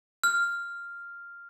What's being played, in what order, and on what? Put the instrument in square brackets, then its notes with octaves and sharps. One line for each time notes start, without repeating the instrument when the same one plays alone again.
[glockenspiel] F6